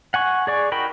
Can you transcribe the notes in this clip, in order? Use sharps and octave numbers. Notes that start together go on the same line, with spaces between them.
F#5 G#5 C#6
G#4 D5 C#6
D#4 F#4 A#4 G5 B5